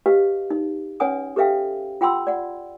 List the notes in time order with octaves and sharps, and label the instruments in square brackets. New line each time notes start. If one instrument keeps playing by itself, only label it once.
[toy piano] G4 B4 D#5 F5
D#4
C#4 B4 C#5 F#5 G#5 D#6
G4 A4 B4 E5 F5 G5
F4 F#5 G5 B5 C6 E6
D5 F#5